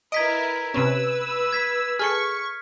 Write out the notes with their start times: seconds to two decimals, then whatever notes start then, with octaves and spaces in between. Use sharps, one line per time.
0.12 E4 A#4 B4 D#5 G#6 B6 D7
0.74 C3 C4 C#4 B4 E6
1.53 G#6 B6
1.99 G#4 A4 C#6 F6 C#7